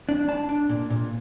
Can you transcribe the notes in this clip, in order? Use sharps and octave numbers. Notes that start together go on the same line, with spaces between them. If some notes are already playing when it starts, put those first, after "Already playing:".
D4
D4 A5
D4
A#2
A#2